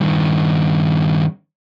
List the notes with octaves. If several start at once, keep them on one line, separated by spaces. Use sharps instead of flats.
G2 D#3